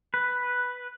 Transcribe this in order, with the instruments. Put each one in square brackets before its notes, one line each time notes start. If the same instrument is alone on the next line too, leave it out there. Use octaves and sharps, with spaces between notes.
[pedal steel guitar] B4